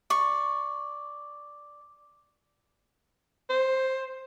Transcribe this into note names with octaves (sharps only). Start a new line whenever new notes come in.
D5 C#6
C5